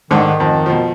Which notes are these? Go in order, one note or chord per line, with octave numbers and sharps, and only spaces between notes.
G#2 D3 D#3
F2
B2 F3